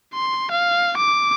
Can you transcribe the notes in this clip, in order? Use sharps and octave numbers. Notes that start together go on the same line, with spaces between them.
C6
F5
D6